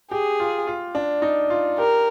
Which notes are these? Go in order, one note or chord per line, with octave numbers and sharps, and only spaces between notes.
G4 G#4
F4
F4
D4
D#4
F4
G4 A#4